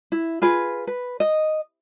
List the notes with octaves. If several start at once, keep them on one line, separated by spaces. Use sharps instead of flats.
E4
F4 G#4 B4
B4
D#5